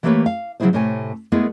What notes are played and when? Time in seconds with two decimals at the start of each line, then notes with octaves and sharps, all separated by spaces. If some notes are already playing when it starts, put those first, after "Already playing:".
0.03 E3 A3 A#3 G4 B4 C#5
0.26 F5
0.60 C#3 F#3 A3 E4 G#4 C5
0.73 A2 C3 A3 C#5 G#5
1.32 G#3 A3 B3 E4 G#4 A#4